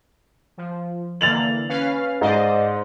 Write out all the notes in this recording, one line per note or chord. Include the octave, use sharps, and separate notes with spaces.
F3
D3 E3 A#3 A6 F7 F#7
C#4 B4 F5
G#2 C5 D5 D#5